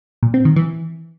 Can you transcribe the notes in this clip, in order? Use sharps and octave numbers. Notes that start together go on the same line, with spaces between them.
A#2
C4
D#3
E3